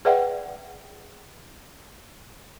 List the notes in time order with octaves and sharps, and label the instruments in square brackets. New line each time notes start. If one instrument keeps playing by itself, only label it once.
[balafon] G#4 B4 D5 E5 F#5 G5